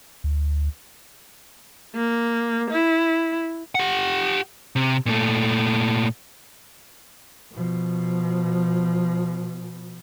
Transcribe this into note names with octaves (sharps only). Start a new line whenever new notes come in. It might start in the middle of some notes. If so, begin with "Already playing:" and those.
D2
A#3
E4
G4 F#5
C3
A#2 A3
B2 F3